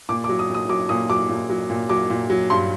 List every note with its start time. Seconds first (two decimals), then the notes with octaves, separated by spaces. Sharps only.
0.09 A#2 D6
0.24 D6
0.29 F#3
0.39 D#6
0.50 A#2 D#6
0.69 F#3 D6
0.89 A#2 D#6
1.10 F#3 D6
1.29 A#2
1.49 F#3
1.70 A#2
1.89 F#3 D6
2.10 A#2
2.30 F#3
2.50 G2 C6